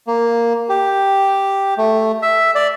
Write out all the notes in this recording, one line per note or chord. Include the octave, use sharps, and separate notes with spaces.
A#3
G4
A3
E5
D5